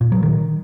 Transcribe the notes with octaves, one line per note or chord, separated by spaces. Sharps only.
A#2
F#3
D#3